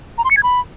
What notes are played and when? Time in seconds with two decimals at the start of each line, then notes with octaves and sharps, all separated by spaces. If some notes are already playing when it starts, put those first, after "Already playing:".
0.18 A#5
0.24 C6
0.31 C#7
0.37 G#6
0.43 B5